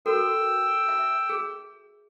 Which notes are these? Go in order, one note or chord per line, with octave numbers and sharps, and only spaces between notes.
F#4 A4 A#4 G5 E6
E5
G#4